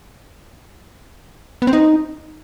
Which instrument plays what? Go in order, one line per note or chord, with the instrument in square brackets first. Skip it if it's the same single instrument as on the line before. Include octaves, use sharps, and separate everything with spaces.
[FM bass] B3
C4
D#4